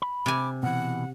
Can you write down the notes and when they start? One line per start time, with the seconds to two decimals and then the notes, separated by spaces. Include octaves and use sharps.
0.02 B5
0.26 C3 G#5 D6
0.63 B2 E3 F#5